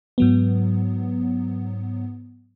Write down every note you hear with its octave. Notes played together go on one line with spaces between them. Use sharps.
G#2 F#3 B3